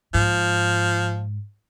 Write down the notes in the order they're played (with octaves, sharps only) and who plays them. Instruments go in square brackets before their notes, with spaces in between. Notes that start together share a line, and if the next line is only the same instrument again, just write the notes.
[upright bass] G#2 [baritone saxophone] F3